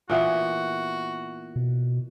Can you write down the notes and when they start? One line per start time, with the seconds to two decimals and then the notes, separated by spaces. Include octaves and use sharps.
0.10 A#2 E3 B3 F#4
1.56 B2